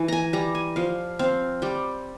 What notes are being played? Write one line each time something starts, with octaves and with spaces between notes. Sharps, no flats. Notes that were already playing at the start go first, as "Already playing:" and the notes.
Already playing: E3
G#5 A#5
G3 A#5
G#5
F3 F5
C4 F5
G3 G5